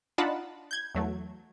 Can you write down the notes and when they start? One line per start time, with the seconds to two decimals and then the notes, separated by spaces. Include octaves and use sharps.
0.18 D4 D#4 F4 F#5 A5 B5
0.71 G6 G#6
0.95 E2 F#3 A3